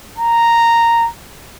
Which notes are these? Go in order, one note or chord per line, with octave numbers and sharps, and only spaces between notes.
A#5